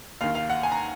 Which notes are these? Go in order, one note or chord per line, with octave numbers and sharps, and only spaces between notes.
D#2 D#3 F5
F5
F#5
G#5
A#5